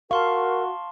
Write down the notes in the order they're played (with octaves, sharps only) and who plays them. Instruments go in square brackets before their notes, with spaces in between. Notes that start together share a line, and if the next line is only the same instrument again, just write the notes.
[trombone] F#4 [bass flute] A#4 [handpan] F5 [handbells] A5 C6 C#6